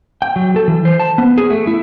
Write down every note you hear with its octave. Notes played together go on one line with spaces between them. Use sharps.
G5
F#3
A4
E3
C5
A5
B3
G#4
A3
E4